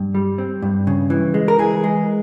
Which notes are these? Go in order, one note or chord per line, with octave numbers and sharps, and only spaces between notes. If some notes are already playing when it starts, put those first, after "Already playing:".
Already playing: G2
G3
C4
G2
C#3
E3
G#3
A#4
E3 G#4
G#3